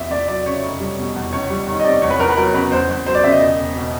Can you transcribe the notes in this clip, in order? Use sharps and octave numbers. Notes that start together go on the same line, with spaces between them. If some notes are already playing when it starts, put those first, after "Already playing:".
Already playing: E2 C3 E5
E2 D5
F#3 D5
C#3 C#5
F1
G3
B2
E2
C#2 C#5
G3
D#3
D#5
C3 D5
E2 C#5
B4
E2 A#4
B4
F#3 A#4
C#3 B4
E2 C5
E2
F#3 C5
D5
C#3 E5
D#5
E1
E1
B2